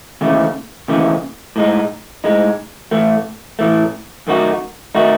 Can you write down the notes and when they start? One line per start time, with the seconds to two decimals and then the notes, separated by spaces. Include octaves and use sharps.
0.21 D#2 C#3 E3 A3
0.88 D#2 C#3 E3 A3
1.56 A2 G#3 D#4
2.24 A2 G#3 D#4
2.91 A2 E3 A3
3.59 A2 E3 A3
4.27 F#2 D#3 A3 D#4 F#4
4.95 D#3 A3 D#4 F#4